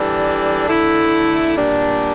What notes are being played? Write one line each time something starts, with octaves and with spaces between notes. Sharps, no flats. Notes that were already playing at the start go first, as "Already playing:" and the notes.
Already playing: E3 G3 D4 A4 D5
D3 A3 E4
A#2 G3 D4